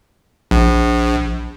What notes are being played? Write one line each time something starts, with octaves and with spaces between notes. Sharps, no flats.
A#1